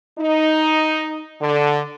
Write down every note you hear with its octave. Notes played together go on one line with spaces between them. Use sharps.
D#4
D3